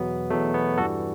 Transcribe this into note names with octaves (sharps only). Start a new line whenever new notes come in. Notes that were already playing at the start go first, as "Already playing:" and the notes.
Already playing: E2 B2 F#3 B3
E2 B2 F#3 A3
B3
G2 E3 G3 F#4 A4